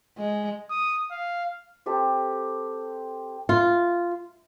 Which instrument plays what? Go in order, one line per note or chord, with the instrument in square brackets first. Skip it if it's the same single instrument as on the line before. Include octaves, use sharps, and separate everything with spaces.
[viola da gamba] G#3
[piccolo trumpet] D#6
F5
[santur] C4 G4 A4 A5
[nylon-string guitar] F4